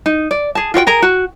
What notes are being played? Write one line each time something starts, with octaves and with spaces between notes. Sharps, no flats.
D#4
D5
G#4 A5
F4 F#4 C#5 G5
G#4 A#4 A#5
F#4